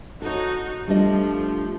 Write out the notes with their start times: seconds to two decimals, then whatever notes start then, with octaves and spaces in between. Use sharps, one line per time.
0.22 D#4 F#4 A4 C#5
0.88 F3 G3 A3 D4 D#5